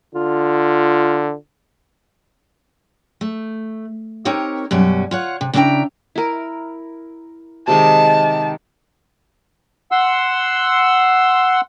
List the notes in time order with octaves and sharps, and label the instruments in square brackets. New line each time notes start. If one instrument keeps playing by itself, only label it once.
[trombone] D3 [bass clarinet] F4
[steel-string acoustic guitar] A3
C4 D#4 G4 A#4 C#5
F#2 B2 G3 C#4
F4 C#5 F#5
C3
C#3 D4 E4 B4 G5 A#5
[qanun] E4 A#4
[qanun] C3 D#3 G#3 [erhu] A5
[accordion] F#5 C6 E6